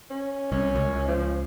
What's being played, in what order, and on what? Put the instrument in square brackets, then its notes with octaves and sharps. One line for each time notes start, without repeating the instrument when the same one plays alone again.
[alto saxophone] C#4
[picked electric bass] C2 [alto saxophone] C#4
[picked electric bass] C#2
[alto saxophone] F3